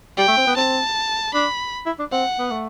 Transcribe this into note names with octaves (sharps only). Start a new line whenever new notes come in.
G3 G5
A3
C4
B3
C4 A5
D4 B5
E4
D4
C4 F#5
B3
A3